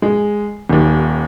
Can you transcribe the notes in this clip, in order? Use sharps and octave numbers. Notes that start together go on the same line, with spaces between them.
G#3
D#1 D#2